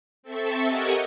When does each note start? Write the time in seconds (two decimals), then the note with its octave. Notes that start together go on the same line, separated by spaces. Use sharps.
0.23 C4 A4 E5 C#6 A6
0.65 G4 A#4 D#5 F#5 G#5 C#6